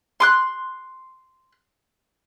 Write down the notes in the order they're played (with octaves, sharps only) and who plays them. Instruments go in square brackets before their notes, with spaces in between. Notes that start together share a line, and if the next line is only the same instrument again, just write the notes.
[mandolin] C6 D6 F#6